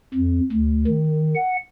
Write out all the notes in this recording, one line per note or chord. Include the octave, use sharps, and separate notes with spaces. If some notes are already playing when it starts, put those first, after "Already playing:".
F2
D2
D#3
F#5